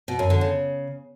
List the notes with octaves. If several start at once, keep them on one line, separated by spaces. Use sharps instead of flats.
B2
F#2
D3
C#3